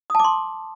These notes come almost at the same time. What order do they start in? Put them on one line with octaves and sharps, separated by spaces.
D#6 A5 D6 C6